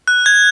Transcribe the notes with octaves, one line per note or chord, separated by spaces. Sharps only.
F#6
G#6